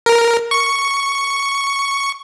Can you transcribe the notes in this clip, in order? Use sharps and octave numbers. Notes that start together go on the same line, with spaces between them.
A#4
C#6